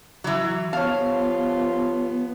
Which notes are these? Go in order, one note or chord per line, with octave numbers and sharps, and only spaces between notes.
E3 F#3
G2 F3 B3 F4 C#5 F5 A5